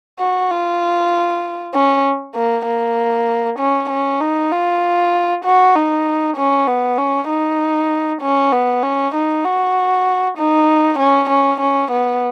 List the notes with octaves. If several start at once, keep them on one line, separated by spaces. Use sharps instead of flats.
F#4
F4
C#4
A#3
A#3
C#4
C#4
D#4
F4
F#4
D#4
C#4
B3
C#4
D#4
C#4
B3
C#4
D#4
F#4
D#4
C#4
C#4
C#4
B3